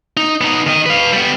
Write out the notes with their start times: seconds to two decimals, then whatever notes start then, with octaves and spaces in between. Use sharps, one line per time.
0.17 D#4
0.41 B3 D#4
0.67 D#3 D#5
0.86 B4 F5
1.13 G3 B3